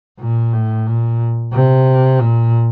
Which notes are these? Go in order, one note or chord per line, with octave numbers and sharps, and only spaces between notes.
A#2
A2
A#2
C3
A#2